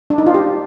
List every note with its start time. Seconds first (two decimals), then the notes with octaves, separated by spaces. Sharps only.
0.10 D4
0.18 D#4
0.26 F4
0.34 G4